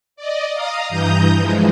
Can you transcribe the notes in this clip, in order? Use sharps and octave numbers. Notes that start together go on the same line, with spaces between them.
D5 D#5
F5 A#5 D#6
G2 E3 A#5 D#6 G6
E3 F3 G#3